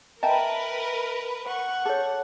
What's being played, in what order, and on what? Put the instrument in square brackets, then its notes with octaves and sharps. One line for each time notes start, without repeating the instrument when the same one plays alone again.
[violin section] A#4 B4 [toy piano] D#5 A#5 [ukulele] E5 G5 A5
[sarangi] F#5 [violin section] C#6
[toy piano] G#4 C#5 [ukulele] A4